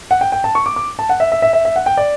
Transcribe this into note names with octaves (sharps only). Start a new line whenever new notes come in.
F#5
G5
G5
A5
C#6
D6
D6
A5
F#5
E5
E5
E5
E5
E5
F#5
G5
D5